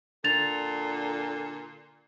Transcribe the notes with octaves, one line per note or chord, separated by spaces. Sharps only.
A#2 D3 A4 A6 F7